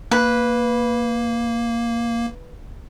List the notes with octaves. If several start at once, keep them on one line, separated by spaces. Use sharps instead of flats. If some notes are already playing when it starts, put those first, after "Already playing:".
A#3 B4